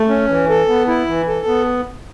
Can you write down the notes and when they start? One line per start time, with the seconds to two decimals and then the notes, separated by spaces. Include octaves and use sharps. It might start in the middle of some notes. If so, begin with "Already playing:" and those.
Already playing: A3
0.09 C#4
0.28 E3
0.49 A4
0.68 B3
0.88 E4
1.07 E3
1.28 A4
1.47 B3